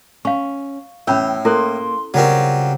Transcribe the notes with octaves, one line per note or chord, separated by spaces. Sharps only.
C#4 F5 C#6
E2 A2 C#4 G5 B5 E6
A#3 E4 A4 C5 C6
C#3 F#3 G3 C4 F4 A#4 C#5